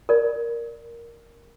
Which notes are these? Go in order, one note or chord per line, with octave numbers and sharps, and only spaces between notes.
A#4 D5